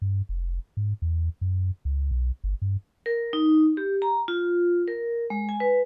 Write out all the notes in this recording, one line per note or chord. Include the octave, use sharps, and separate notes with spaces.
G2
F1
G#2
E2
F#2
C#2
B1
G1
G2
A#4
D#4
G4
A#5
F4
A#4
G#3
G#5
B4